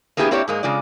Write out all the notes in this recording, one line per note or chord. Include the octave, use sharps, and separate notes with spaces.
A#3 B3 E4 G4 G#4
A#3 C4 E4 G4 C#5 D5
G#2 G#3 A#3
C#3 G#3 F4 D5